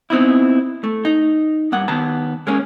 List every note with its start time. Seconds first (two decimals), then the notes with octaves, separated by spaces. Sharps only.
0.10 B3 C4 D#4 E4
0.84 A3
1.05 D#4
1.72 G2 A#3 F#5
1.88 D#2 B3 A5 A#5
2.47 G#3 A#3 C#4